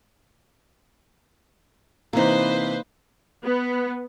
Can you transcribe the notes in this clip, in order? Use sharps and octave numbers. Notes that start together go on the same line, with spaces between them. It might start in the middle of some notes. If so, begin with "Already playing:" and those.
C3 E3 A#3 D#4 B4 C5
B3